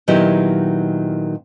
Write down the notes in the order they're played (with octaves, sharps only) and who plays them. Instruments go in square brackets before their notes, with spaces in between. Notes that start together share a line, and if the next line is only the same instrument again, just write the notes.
[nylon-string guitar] A#2 D#3 F#3 B3 E4 G4